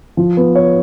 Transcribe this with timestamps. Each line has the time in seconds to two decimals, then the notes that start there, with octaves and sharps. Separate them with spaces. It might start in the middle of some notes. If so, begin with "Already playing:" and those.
0.17 F3
0.37 B3
0.55 C#5